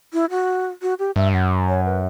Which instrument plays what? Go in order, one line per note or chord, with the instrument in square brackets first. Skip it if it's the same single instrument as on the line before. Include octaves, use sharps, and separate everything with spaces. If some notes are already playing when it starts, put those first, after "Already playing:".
[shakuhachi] E4
F#4
F#4
G4
[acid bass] G2 [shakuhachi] E5
[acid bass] F#2 [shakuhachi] F#5
[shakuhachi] C#5
B4